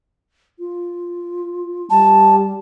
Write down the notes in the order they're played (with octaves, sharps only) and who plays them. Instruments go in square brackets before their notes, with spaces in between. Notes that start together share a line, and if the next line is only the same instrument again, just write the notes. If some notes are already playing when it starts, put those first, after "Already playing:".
[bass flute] F4
[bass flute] G3 [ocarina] A5